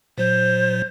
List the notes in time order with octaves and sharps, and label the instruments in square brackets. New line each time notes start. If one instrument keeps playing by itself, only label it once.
[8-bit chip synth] A#2 F#3 [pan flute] C5